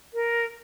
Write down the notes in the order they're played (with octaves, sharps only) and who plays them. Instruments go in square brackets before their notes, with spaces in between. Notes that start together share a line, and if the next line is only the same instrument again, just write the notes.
[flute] A#4